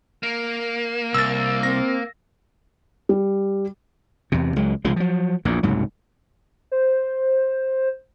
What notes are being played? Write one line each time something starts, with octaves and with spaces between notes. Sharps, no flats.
A#3
C2 E6 A6
C4 A#6
G3
E2 C3
C#2 F#3 G#3
C2 C#3 F3 G#3
F3 F#3
A#1 E2 A#2
F#1 C2 G#2 F#3
C5